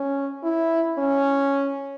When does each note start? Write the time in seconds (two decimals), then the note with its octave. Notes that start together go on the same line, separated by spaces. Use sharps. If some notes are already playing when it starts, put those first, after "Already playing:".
Already playing: C#4
0.43 E4
0.98 C#4